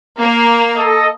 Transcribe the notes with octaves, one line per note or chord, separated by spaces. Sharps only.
A#3
A4 D#5